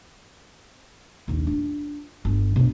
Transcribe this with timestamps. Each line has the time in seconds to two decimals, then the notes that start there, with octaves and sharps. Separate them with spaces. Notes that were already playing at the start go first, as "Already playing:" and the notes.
1.28 A#1 D#2
1.47 D4 F4
2.25 G1
2.56 B2 D4